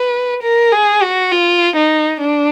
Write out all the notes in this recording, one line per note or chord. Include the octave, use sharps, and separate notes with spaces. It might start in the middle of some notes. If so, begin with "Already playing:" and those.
Already playing: B4
A#4
G#4
F#4
F4
D#4
D4